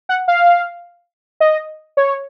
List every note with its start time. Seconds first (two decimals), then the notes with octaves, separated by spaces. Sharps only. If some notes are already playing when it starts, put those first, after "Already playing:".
0.09 F#5
0.28 F5
1.40 D#5
1.97 C#5